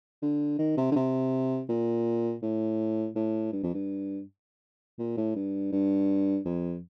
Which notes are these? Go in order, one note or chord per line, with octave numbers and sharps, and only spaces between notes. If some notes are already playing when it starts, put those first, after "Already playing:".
D3
D#3
C3
D3
C3
A#2
A2
A2
G2
F2
G2
A#2
A2
G2
G2
F2